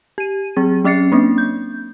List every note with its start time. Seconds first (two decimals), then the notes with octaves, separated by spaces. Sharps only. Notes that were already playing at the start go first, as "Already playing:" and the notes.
0.18 G4 D#7
0.57 F#3 C4 G#4
0.84 F#3 C#4 E5 A6 C7 C#7
1.12 A#3 C4 D4
1.38 G6